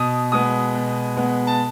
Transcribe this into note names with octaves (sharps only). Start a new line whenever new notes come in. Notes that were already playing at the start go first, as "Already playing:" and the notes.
Already playing: B2 D#6
G#3 B3 D#6
B2
G#3 B3
A5